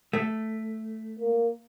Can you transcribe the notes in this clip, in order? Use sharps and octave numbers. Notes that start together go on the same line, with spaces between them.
A3
A#3